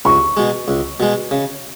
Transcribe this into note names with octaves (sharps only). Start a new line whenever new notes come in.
C#2 C#6
B2 G#3
C#2
B2 G#3
C#3